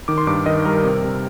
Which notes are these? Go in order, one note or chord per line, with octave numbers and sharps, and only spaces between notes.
D#3 D6
C6
G2 D6
D#3 D#5
G3 A#4
C3
C3